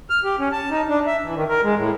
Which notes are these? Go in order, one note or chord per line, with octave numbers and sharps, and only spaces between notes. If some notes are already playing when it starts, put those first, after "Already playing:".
F6
G4
C#4
A5
D#4
D4
E5
E3
D#3
A#4
G#3
A2